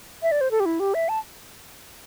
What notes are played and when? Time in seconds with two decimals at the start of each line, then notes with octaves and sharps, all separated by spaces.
0.23 E5
0.32 D5
0.41 C5
0.51 A4
0.60 G4
0.66 E4
0.80 G4
0.94 E5
1.09 A5